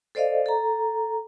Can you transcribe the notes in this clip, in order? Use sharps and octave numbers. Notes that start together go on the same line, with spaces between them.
A4 C5 D5 D#5 F5
A4 A#5